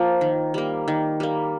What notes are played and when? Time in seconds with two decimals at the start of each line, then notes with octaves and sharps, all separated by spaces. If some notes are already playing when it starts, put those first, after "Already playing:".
Already playing: F3 A#3
0.21 D#3
0.54 G3 A#3
0.88 D#3
1.20 G3 A#3